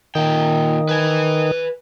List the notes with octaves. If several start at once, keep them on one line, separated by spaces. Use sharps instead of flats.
A#2 D#3 G5
B4 G#5